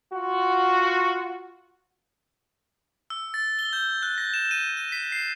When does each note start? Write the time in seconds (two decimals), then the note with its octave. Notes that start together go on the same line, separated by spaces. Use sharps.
0.13 F4 F#4
3.10 E6
3.34 A6
3.59 G7
3.73 G6
4.03 F#6
4.18 A#6
4.34 E7
4.51 D#7
4.77 D#7
4.92 B6
5.12 C7